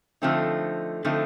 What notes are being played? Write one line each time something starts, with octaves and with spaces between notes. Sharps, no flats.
D3 F3 A3 C4 D#4
D3 F3 A3 C4 D#4